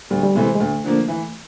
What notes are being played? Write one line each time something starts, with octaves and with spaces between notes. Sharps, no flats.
D2 G3
G3
C3 E3 G#3 A3 C4
G#3
D2 A3
D3 F3 A#3
E3